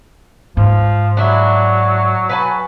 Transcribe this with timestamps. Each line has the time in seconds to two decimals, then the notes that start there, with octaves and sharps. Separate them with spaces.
0.57 G#2 F3
1.17 F#3 D4 E4 E5
2.29 B4 G#5 A5